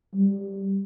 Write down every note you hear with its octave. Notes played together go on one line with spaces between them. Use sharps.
G3